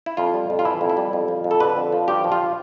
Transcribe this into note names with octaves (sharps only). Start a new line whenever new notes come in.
E4
F2 F4
G3
F2
F4
E3 E4
F2
E4
G3
F2
F3
F2
A4
D3 B4
F2
F3
G2 G4
F3
F4